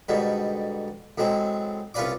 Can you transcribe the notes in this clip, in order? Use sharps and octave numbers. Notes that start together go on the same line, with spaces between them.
G#2 B2 D3 G3
A2 F#3 G#3 C4
C2 C#4 F4 B4 D5 D6